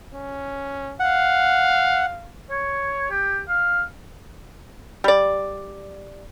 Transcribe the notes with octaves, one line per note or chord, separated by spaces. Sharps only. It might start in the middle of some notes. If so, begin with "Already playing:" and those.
C#4
F5 F#5
C#5
G4
F5
G3 D5